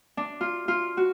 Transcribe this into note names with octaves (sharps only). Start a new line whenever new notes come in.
D4
F4
F4
F#4